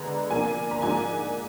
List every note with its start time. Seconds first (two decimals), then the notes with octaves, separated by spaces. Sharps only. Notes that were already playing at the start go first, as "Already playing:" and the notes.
Already playing: D3 G#3 B3 D4 A#5
0.30 A#2 F3 A#3 D4 G#5
0.71 A#5
0.82 G#2 F3 A#3 D4 G#5